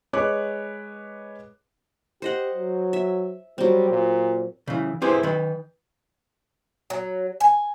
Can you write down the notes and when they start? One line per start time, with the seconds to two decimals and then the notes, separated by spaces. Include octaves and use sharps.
0.13 G#3 B4 C#5 D6 F#6
2.22 G4 C5 D#5 F#5
2.55 F#3
2.93 E5
3.58 F#3 G3 C4
3.90 A#2
4.67 C#3 E3
5.02 C4 E4 G4 G#4 B4 C5
5.23 D#3 B4
6.90 F#3
7.40 G#5